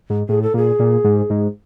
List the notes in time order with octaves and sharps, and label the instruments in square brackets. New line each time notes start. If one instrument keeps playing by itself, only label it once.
[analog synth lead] G#2
[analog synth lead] A2 [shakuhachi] G#4
[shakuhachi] A4
[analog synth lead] A#2 [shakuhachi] G#4
[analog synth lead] A#2
G#2
G#2